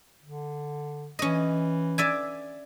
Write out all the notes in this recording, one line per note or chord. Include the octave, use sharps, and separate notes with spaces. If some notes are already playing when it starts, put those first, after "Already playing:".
D3
E3 C#4 D#5
D5 E5 G#5